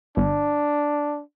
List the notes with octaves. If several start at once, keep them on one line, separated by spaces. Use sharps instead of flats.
G1 D4